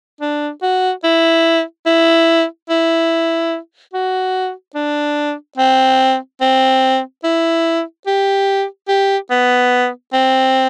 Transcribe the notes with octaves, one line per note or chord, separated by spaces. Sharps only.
D4
F#4
E4
E4
E4
F#4
D4
C4
C4
E4
G4
G4
B3
C4